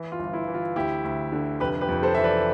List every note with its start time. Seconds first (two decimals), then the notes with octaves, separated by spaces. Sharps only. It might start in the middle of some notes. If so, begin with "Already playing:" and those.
Already playing: E3
0.12 F4
0.19 G1
0.33 E4
0.48 E3
0.54 F4
0.76 D2 E4 G4
1.04 D2
1.32 D3
1.60 F1 G4 B4
1.81 G4 B4
1.89 F2
2.03 A4 C5
2.15 E3 E5
2.24 B4 D5